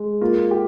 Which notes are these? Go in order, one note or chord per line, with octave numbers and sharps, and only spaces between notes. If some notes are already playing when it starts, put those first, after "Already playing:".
Already playing: G#3
A#3 F4
G4